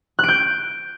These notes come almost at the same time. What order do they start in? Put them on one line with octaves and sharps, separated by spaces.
F#6 D7 G6